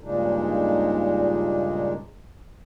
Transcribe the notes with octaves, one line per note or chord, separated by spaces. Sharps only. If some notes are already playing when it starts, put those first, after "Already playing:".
G2 A#2 C#3 G#3 D4 D#4